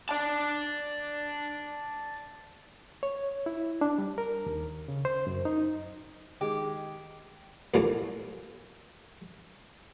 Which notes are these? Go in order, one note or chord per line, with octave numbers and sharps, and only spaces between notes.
D5 A5
C#5
E4
D4
G3
A#4
D#2
C#3
C5
F#2
D#4
D#3 G#3 G4
D#2 A#2 E3 F#3 A3 A#3